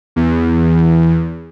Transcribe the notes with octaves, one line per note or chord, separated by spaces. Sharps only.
E2